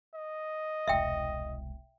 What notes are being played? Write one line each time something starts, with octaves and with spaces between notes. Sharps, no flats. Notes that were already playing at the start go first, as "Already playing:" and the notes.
D#5
E1 C2 E5 G5